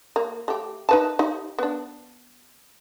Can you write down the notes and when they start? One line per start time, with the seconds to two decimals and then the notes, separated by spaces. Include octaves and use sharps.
0.16 A#3
0.48 A3 G4
0.89 D#4 B4 A5
1.19 D#4 G4
1.58 B3 D4